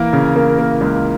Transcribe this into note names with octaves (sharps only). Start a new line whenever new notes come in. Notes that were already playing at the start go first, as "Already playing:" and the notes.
Already playing: E3 A#3 A#4
C#3
A#3
A#3
C#2